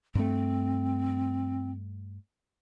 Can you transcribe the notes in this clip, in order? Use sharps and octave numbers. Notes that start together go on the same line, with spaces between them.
G2 A3 C4